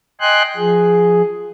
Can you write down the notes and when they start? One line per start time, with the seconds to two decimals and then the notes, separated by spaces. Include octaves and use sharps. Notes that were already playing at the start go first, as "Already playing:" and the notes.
0.20 D#5 G5 G#5 C6 F#6
0.56 F3 G#4